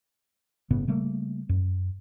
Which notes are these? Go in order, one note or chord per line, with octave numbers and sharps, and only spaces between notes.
G1 A2 C#3 B3
C#3 G3 A3 A#3
F#2